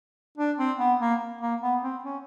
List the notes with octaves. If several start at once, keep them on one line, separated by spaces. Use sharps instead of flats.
D4
C4
B3
A#3
A#3
B3
C4
C#4